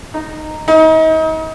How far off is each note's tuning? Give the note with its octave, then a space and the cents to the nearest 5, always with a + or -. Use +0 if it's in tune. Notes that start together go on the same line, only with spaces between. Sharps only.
D#4 -10
D#4 +35